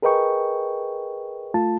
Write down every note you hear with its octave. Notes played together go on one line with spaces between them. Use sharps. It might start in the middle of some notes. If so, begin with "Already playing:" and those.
G#4 A#4 B4 D#5 G5 C#6
A3 F4 A5